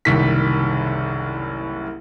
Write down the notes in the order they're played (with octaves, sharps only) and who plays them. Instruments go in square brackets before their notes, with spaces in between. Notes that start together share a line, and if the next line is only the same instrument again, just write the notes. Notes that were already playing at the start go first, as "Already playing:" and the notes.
[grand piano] F#1 C2 D#3 B6